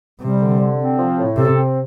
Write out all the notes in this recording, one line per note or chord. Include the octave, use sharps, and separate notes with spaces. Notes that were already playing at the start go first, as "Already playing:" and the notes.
C3 G3
D3
D3
C4
F3
A2
C3 A4
C4